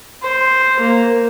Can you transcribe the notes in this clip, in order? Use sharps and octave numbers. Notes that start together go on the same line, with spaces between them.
C5
A#3